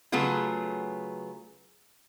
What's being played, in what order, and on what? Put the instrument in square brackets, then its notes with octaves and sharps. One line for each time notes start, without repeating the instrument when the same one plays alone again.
[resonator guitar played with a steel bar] C#3 F#3 A3 B3 F4 G#4